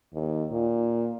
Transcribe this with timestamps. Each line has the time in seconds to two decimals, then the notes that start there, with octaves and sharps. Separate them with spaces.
0.13 D#2
0.52 A#2